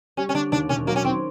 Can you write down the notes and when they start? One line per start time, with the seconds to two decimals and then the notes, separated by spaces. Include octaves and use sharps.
0.17 G3 C#4
0.29 C#4
0.35 D3 D4
0.52 D#2 D4
0.69 E1 C#4
0.87 F#3 A#3
0.96 C#4
1.04 D#3 C4